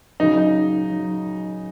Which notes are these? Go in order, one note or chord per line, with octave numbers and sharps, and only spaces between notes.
C#3 F#3 D#4
D#4
F#3